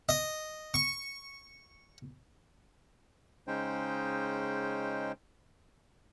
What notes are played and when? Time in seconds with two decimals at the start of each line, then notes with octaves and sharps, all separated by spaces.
0.09 D#5
0.74 C#6
3.47 C#3 G#3 C#4 D#4 C5 G5